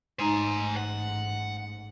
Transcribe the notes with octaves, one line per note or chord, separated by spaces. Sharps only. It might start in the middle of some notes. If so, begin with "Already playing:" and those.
A1 G#2 G#3 D#4 C5 G#5 A#5
F#5